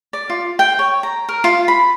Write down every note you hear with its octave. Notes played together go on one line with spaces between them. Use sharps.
D5
F4
G5
C#5
A#5
A#4
F4
B5